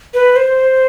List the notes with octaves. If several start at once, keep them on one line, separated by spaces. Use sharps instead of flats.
B4
C5